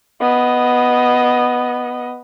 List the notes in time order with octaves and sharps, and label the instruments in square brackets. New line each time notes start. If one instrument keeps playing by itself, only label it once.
[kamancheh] B3 D#5